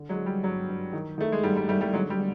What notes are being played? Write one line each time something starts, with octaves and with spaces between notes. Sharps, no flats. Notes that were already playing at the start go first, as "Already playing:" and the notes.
Already playing: D3
F#3 G#3
D3
G3
G2 F#3
G2
D#3
D#3 A3
G#3
G#2 G3
G3
G#2 G3 A3
G3 A3
D3 F#3 G#3
G3
D3